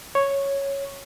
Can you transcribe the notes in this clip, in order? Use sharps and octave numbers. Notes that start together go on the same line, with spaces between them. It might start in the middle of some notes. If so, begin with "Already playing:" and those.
C#5